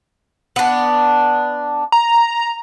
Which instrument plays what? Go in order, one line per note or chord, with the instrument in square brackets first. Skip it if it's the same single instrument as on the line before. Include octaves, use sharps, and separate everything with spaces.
[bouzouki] B3 D4
[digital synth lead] A#5